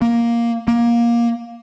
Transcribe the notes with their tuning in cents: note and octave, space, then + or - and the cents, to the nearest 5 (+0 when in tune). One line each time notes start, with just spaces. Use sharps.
A#3 +5
A#3 +15